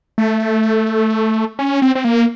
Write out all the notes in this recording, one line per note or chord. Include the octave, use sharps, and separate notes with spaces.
A3
C#4
C4
C4
A#3